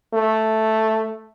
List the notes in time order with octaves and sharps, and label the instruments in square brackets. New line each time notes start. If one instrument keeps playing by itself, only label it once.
[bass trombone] A3